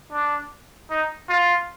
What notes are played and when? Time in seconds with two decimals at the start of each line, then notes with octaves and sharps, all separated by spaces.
0.12 D4
0.90 D#4
1.29 F4